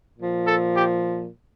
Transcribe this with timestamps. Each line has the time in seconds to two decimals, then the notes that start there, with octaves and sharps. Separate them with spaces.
0.18 A#2 F3
0.46 A4
0.75 G4